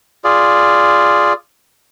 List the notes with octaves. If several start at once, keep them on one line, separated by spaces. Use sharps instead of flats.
F4 G#4 D5